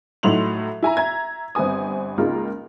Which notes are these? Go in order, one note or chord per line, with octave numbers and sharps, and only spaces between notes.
A2 F#3 D#4 C6 F7 F#7
E4 G#5 A#5
E5 A#5 G#6
G1 C4 B4 G#5 D#6
C#2 G#3 A#3 D#4 F4 A#4